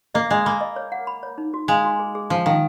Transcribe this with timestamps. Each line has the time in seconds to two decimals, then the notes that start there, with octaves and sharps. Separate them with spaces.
0.15 A#3 D#5
0.30 G#3 D#5
0.45 A#3 B5
0.61 D#5
0.76 C#5
0.92 F#5
1.07 B5
1.23 C#5
1.38 D#4
1.54 F#4
1.68 G#3 F5
1.84 F#4
2.00 G#4
2.15 G#4
2.30 F3 F5
2.46 D#3 F5